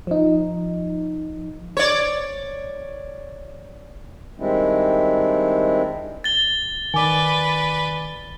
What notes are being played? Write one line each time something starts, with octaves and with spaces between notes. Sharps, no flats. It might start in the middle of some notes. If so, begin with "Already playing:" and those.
F3 D#4
C#5 D5
D#3 G3 G#3 C4 D4 E4
A6 G7
D#3 B4 D5 G#5 D6